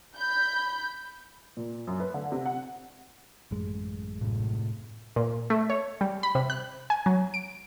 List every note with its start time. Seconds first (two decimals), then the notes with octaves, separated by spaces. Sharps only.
0.16 B5 G6
1.57 A#2
1.87 F#2
2.00 B4
2.14 D3
2.32 C3
2.45 F#5
3.51 A1 F#2 G#3
4.20 A2 C3
5.16 A#2
5.50 A3
5.70 C#5
6.01 G3
6.23 B5
6.35 C3
6.50 F#6
6.90 G#5
7.06 F#3
7.34 D7